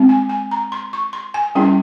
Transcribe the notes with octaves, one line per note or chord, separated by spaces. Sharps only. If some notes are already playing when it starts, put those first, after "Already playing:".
Already playing: G#3 C4
G#5
G#5
A#5
C6
C#6
C6
G#5
G3 C#4 E4 G5